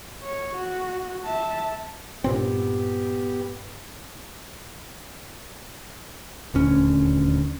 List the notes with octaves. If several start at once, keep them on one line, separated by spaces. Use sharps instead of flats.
C#5
F#4
E5 A5
G2 A#2 B3 C4 G4
D#1 D2 C#4